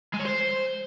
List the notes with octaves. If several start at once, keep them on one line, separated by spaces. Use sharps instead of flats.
G#3
C#5
C5